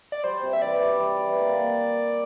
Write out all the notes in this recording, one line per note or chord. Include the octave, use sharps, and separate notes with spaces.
D5
G3 C5
C3
E5
E3 D5
G3
G3
E3
A#3